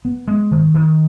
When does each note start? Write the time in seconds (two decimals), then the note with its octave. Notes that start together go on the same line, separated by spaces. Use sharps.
0.05 B3
0.28 G#3
0.51 D#3
0.74 D#3